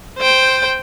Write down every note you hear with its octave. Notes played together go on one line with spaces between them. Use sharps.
C5 G5